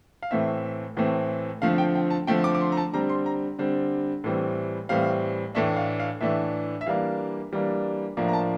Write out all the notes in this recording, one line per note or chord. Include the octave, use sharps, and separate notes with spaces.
F5
A2 E3 A3 C4 E5
A2 E3 A3 C4
D3 F3 A3 C4 F5
G5
G5
A5
D3 F3 A3 C4 G5
D6
D6
C6
A#5
A5
D3 G3 C4 A#5
C6
A#5
D3 G3 C4
A2 E3 G3 C4
A2 E3 G3 C4 F5
A2 E3 A3 D4 E5
F5
F5
A2 E3 A3 D4 E5
E5
E3 G3 A#3 D4 F5
E3 G3 A#3 D4
A2 F3 A#3 D4
A#5
A5